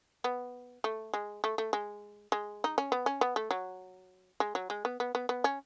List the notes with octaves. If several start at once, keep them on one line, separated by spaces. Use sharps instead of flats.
B3
A3
G#3
A3
A3
G#3
G#3
D#4
C#4
B3
C#4
B3
A3
F#3
G#3
F#3
G#3
B3
B3
B3
B3
C#4